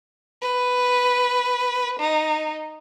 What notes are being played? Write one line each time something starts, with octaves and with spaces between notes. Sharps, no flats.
B4
D#4